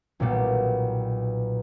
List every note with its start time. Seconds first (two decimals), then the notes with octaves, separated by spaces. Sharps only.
0.20 B1 A#2 G3 B3